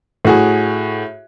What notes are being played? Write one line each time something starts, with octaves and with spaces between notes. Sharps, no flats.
A2 F#4 G#4